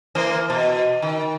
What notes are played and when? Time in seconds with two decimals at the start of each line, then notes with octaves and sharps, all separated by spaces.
0.15 E3 A#3 C5
0.50 B2
1.02 D#3